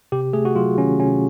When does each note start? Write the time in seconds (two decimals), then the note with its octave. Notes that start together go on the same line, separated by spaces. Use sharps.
0.12 C3 G4
0.33 A3 G#4
0.45 F#4
0.56 F#3 F4
0.78 D#3 C#4
1.00 C3 C#4